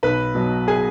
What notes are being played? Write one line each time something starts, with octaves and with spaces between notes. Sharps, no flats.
B1 B4 B5
B2 F#3
G#4 G#5